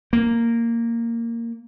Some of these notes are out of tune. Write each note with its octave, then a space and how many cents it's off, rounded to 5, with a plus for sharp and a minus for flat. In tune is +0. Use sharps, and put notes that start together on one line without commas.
A#3 -10